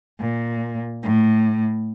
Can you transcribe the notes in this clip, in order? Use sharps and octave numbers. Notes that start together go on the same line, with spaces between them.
A#2
A2